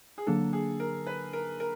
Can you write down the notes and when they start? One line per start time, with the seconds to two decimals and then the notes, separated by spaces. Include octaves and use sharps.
0.18 G#4
0.27 D3 F#3 A#3 D4 A4
0.53 G#4
0.80 A#4
1.07 B4
1.33 A#4
1.60 A#4